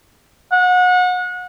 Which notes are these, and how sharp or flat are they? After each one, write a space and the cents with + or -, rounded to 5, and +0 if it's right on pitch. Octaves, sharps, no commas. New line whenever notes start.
F#5 -30